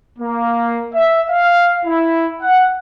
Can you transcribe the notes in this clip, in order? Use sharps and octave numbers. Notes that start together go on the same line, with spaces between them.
A#3
E5
F5
E4
F#5